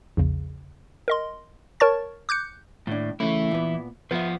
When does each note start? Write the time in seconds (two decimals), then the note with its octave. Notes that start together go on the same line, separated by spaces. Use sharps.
0.17 A#1 E2 C#3
1.08 A#4 D#5 C6
1.80 A#4 C#5 A5 C#6 A6
2.29 D6 F#6 G6 C#7
2.87 D#2 A2 D4
3.20 C#3 E3 A3 E4
3.51 A#2 B3
4.11 F3 B3 B4 E5